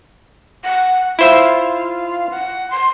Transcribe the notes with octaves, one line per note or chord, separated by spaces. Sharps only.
F#5
E4 F4 C5 E5
F#5
C6